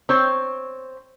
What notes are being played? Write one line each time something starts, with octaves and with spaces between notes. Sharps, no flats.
C4 C#5